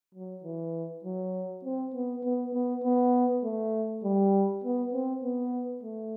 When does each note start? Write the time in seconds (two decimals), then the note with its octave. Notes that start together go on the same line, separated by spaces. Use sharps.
0.15 F#3
0.44 E3
1.04 F#3
1.64 C4
1.94 B3
2.24 B3
2.54 B3
2.84 B3
3.44 A3
4.04 G3
4.64 B3
4.93 C4
5.24 B3
5.83 A3